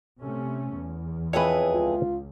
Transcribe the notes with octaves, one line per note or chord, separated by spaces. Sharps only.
C3 A3 C#4
E2
F2 E3 G#4 B4 C#5
C#2 F4